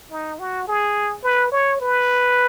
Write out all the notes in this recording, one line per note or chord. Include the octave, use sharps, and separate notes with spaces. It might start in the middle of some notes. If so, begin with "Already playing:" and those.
D#4
F#4
G#4
B4
C#5
B4